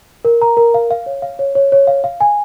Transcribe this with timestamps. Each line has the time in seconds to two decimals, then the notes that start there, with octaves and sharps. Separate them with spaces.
0.25 A#4
0.42 A#5
0.57 A#4
0.74 F5
0.91 F5
1.06 C#5
1.22 F5
1.39 C#5
1.55 C#5
1.72 C#5
1.87 F5
2.04 F5
2.20 G#5